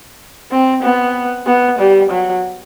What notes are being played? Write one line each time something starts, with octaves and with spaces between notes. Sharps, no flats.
C4
B3
B3
G3
F#3